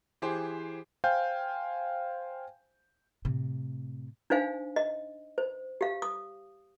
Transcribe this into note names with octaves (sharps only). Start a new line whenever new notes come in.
E3 G4 G#4 C5
C5 F5 G5 G#5 G6
A2 C3
D4 D#4 C5 F5 G#5
D#5
C5
G4 F5
D#6